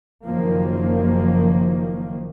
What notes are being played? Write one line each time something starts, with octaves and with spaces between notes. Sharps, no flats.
F#1 F#2 D#3 F3 A#3